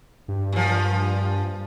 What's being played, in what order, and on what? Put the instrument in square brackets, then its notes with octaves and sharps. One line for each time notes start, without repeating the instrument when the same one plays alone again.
[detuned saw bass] G2
[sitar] A#2 F3